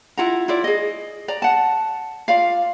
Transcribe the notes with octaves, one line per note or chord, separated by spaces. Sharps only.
E4 F4 F#5 A#5
E4 F4 D5
G#4 D#5
D5 A#5
F#5 A5
F4 D5 F5